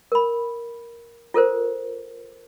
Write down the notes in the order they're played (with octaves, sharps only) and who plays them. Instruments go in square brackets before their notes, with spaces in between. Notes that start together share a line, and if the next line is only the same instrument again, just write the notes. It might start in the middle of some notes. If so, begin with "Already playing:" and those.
[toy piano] A#4 B5
F4 A4 A#4 C5